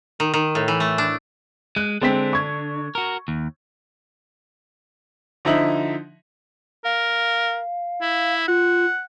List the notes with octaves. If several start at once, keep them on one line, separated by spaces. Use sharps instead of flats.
D#3
D#3
A2
E3
A3
D4
G#3 F#6
D3 G#3 C4 D4 B6
C#6 G#6
F#4 A#4
D#2
D3 F3 D#4 E4 E5 F#7
A#4 F5
E4
F4 F#5